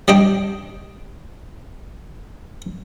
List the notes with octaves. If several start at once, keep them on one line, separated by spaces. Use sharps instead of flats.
G3 D4 D#5 G5